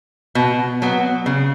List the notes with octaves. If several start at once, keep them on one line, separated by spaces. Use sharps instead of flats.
B2
F#3 B3
C#3